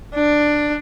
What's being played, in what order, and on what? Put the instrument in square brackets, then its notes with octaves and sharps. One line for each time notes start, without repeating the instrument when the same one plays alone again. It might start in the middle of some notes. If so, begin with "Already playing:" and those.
[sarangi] D4